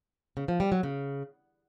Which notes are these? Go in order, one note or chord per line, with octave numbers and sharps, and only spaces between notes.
C#3
F3
G3
F#3
C#3